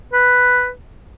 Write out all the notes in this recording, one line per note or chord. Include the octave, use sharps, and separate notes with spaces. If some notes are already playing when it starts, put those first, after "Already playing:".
B4